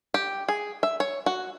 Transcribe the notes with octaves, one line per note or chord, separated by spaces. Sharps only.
G4
G#4
E5
C#5
F#4